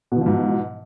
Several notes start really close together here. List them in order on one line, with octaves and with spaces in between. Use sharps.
B2 E3 F3 G#2